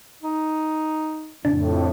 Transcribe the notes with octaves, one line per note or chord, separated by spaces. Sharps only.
D#4
F2 A2 C#3 D4